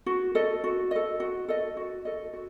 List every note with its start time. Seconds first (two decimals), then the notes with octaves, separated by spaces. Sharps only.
0.06 F#4
0.35 A4 D#5
0.64 F#4
0.91 A4 D#5
1.20 F#4
1.48 A4 D#5
1.77 F#4
2.05 A4 D#5
2.33 F#4